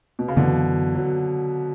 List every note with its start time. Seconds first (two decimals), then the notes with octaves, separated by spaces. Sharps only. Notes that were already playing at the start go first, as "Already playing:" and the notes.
0.19 B2
0.28 C#3
0.37 F#2 B2 D3 E3 B3
0.95 F#3